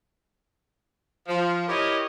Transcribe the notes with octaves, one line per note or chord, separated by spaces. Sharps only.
F3
E4 G4 A#4 C#5 D#5